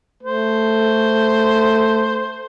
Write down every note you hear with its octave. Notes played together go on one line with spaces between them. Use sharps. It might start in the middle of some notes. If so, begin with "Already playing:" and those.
A3 C5